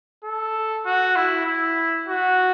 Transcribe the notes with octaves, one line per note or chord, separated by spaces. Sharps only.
A4
F#4
E4
E4
F#4